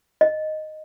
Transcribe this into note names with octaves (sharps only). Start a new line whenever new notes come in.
D#5